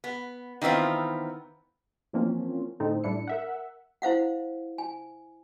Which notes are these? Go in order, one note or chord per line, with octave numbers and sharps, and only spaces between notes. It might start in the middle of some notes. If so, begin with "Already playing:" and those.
B3
D#3 E3 B3 C4 F4
E3 F3 A#3 C4 C#4
A2 D3 C4 D#4 A4
A2 G3 D4 E4 C#7
A#4 E5 F#5
E4 C5 F5 F#5
G#5